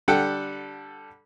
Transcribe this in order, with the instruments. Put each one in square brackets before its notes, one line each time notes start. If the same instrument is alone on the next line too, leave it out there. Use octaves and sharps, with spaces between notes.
[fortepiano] D3 G3 A4 F#5 G5